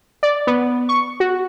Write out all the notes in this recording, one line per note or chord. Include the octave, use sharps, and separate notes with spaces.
D5
B3
C#6
F#4